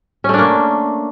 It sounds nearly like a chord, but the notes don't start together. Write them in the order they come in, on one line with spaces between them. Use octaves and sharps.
C#4 A3 D4 A#3